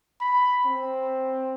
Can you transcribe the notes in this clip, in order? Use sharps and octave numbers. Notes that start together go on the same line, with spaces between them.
B5
C4